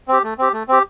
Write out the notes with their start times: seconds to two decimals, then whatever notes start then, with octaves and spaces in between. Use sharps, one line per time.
0.08 C4 G4
0.24 A3
0.38 C4 G4
0.53 A3
0.69 C4 G4